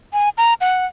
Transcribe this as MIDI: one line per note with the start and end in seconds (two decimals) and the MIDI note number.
0.13 0.29 80
0.38 0.54 82
0.61 0.86 78